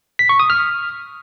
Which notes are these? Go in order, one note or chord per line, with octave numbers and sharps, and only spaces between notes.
B6
C#6
D#6
F6